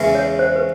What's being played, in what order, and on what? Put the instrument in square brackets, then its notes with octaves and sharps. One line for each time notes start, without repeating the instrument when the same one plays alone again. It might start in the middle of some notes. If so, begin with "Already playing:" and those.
Already playing: [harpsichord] E2 C#3 E3 G#3 C#4
[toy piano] C#5
C5
B4